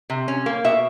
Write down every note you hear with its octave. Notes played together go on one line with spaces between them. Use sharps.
C3
C#4
A#3
B2 E5